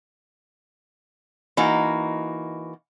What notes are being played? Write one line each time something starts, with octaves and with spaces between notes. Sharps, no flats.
E3 A#3 D#4 F#4